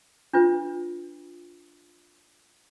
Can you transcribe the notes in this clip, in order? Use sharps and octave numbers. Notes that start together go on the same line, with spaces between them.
D4 F4 B4